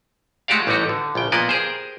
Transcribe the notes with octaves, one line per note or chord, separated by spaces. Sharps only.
G#3 A3 F#4 G4 D5 F5
A1 G3 A3 D#4 F#4
D3
A#1 C#3 G5
A#2 F3 A#3 B3 D5 D#5
G4 G#4 A#4 C5